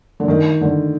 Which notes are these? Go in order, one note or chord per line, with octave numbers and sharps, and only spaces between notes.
D3
D#3
D3